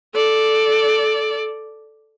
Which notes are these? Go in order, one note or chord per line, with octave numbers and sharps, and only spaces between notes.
A4 D5